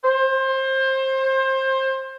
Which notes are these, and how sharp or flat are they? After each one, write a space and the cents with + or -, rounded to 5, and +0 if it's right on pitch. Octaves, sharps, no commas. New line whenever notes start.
C5 +25